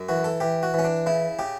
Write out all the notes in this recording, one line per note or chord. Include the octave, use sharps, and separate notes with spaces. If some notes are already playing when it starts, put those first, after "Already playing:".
Already playing: F#2
E3 F#4
A4
E3 G4
F#4
E3 C#4
D4
C#3 E4
C#3 G4